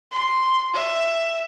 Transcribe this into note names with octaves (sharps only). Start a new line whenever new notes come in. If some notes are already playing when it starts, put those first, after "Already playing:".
C6
E5